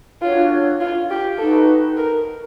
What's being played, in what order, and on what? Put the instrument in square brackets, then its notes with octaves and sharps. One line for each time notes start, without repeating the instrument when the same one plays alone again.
[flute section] D4 F#4 A4 C#5 [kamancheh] F4
[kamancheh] F4
G4
[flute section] D#4 F#4 B4 [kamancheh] A4
[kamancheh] A#4